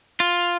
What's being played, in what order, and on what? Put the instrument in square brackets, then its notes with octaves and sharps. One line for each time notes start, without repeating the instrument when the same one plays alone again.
[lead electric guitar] F4